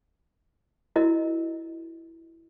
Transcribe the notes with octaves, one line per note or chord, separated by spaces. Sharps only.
E4 F#4 A#4 D#5